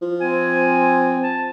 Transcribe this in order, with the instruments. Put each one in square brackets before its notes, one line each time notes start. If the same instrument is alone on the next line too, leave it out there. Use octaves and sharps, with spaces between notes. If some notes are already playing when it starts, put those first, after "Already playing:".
[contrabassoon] F3
[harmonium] C4 [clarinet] G#5
[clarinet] A5